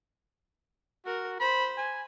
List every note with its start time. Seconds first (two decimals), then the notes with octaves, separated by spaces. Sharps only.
1.06 F#4 A#4
1.40 C5 B5
1.77 G#5